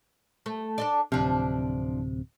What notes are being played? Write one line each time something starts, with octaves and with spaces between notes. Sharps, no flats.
A3
D4 A4 D5
D1 C3 F3 D4